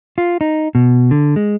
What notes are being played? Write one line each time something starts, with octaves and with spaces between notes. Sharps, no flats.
F4
D#4
B2
D3
G#3